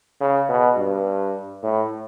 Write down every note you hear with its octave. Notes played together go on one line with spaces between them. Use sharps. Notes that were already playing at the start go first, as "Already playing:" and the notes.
C#3
B2
G2
A2